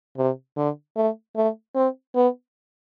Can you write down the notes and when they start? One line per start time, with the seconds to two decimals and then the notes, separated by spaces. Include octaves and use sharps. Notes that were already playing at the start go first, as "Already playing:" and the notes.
0.18 C3
0.57 D3
0.97 A3
1.36 A3
1.76 C4
2.15 B3